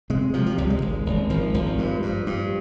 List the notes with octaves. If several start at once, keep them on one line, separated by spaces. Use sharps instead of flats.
C3 G#3
C3 F3
F3
C#2 G3
G#3
G#1
G#1
G#1 F3
G#1 F3
G2
G2
G2